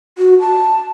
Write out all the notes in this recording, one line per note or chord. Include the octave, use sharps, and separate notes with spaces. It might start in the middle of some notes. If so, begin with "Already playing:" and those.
F#4
A5